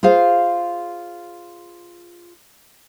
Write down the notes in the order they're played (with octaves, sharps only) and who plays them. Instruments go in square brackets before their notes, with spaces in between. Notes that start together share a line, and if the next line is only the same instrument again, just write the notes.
[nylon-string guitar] F4 G#4 C5 F5